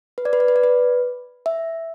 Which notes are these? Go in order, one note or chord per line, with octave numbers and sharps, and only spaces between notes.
B4
D5
B4
D5
B4
D5
B4
E5